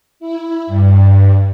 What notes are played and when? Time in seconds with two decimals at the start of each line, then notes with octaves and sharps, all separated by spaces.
0.20 E4
0.67 G2